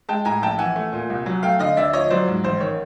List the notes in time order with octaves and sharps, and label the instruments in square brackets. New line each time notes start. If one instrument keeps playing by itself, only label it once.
[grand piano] G#3 G5 A5
A2 G#5 A#5
A#1 G5 A5
E3 F#5 G#5
A3
A#2
C2
F#3
A3 F5 G5
D3 D#5 F5
D2 D5 E5
F3 C#5 D#5
F#3 C5 D5
G#2
A1 C5
D#3 C#5